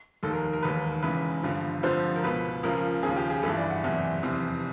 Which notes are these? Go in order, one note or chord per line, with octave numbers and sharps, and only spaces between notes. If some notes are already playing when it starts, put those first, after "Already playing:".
F1 D#2 D#3 A4
A#4
A#4
E1 D#2 D#3 B4
E1 E2 C#3 B4
G1 G2 D3 F3
F1 F2 D3 F3 C5
A#4
C#2 B2 B4
C#2 C#3 F3 A#4
D#2 C#3 F3 G#4
G4
G#4
G1 G2 E3 A4
D5
F#5
F#1 E2 C3 E3
F1 E2 C3